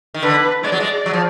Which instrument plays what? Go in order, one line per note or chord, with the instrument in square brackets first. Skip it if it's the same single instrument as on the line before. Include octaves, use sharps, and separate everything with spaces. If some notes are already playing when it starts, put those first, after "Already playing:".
[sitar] D#3
[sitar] D3 [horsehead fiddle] B4
[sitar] G#3 [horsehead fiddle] D5
[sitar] F#3
G#3
F#3
F3